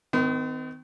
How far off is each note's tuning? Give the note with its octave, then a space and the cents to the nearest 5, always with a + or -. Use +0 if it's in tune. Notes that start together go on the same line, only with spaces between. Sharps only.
D#3 +5 C4 -45